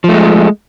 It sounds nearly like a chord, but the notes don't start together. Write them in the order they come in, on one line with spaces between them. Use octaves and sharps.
F3 A3 G#3